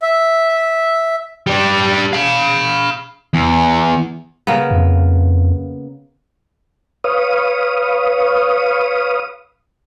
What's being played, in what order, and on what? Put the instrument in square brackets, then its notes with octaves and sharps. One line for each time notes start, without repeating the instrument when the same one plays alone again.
[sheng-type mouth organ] E5
[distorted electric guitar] G3 D4
F5 B5
E2
[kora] C#3 A#3 B3
[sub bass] F2
[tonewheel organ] B4 C#5 F5 D#6